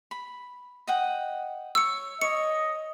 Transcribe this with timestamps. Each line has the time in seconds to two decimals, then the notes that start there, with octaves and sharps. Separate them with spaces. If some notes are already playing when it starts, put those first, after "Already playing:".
0.11 B5
0.87 D#5 F#5 G5
1.75 C#5 E6 C#7
2.21 C#5 D#5 C#7